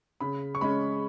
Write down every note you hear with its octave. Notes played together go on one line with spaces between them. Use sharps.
C#3 B5
C#6
G#3 C#4 B5